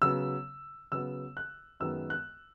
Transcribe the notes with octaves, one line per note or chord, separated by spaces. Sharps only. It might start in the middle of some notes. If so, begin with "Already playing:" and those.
C#3 F#3 B3 E6
C#3 F#3 B3 E6
F#6
F#2 D#3 G#3 B3 E6
F#6